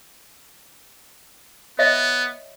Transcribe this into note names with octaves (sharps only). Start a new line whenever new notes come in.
B3 C#5 D#5 E5